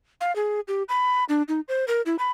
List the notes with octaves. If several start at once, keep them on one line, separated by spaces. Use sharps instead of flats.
F5
G#4
G4
B5
D4
D#4
C5
A#4
E4
B5